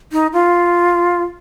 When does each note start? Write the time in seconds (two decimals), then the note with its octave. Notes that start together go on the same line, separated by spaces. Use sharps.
0.12 D#4
0.33 F4